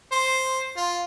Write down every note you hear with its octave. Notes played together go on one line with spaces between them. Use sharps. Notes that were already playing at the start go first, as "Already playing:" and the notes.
C5
F4